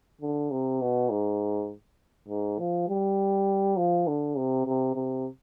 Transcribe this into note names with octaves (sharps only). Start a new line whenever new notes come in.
D3
C3
B2
G#2
G#2
F3
G3
F3
D3
C3
C3
C3